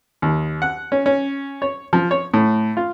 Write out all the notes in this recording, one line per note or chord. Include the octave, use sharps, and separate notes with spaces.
D#2
F#5
C#4
C#4
C#5
F3
C#5
A2
F4